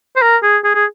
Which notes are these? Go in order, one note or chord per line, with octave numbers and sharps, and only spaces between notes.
C5
A#4
G#4
G#4
G#4